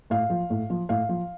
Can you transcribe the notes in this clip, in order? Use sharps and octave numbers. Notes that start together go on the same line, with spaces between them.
A2 F5
F3
A2
F3
A2 F5
F3